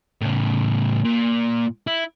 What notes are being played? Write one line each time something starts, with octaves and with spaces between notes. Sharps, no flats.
A2 C#3
A#2
E4